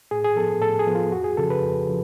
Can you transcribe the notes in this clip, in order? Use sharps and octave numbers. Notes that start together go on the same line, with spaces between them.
A2 G#4
G#4
F3 B3 A4
A2 A4
G#4
F3 B3
F4
F2 F#4
G#4
C#3 F3 A4
B4
F2
C#3 F3